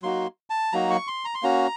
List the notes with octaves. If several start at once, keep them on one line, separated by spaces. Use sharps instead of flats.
F#3 A#3 D#4 F#4 C6
A5
F#3 A#3 D#4 F#4 A#5
C#6
C6
A#5
C6
A#3 C#4 F#4 A#5